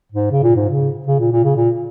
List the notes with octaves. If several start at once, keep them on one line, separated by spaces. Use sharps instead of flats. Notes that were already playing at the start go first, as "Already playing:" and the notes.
G#2
C#3
A#2
G#2
C#3
C#3
A#2
A#2
C#3
A#2